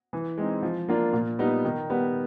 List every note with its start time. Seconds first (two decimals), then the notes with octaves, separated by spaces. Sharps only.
0.13 E3
0.37 G#3 C4 D#4
0.63 F3
0.88 A#3 D4 F4
1.13 A#2
1.39 G3 B3 D#4
1.65 D#3
1.90 G3 B3